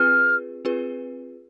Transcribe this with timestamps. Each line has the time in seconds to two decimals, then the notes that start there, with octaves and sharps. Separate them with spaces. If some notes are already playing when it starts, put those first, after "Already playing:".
Already playing: C4 F4 G#4 B4 F6
0.65 C4 F4 G#4 B4